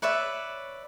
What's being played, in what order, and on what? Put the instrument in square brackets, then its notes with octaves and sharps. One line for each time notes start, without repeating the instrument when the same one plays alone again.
[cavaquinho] B4 C#5 D5 E5